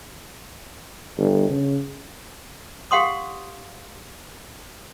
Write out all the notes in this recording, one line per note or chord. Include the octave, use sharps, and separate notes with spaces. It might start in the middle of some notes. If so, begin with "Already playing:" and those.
G1
C#3
G4 F5 F#5 C6 D#6